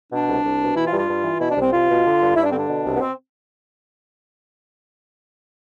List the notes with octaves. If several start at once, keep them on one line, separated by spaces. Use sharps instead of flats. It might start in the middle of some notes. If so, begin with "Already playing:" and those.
B2 D4
C2
C2
B2
E3 E4
F4
G2
F4
G2
E3
B2 E4
D4
C2
C4
C2 F4
B2
D3
G2
G2 E4
D4
D3 C4
D4
B2
C2
B3
C4